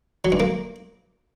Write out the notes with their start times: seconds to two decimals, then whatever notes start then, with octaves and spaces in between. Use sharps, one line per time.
0.25 F#3
0.32 G2
0.40 A#3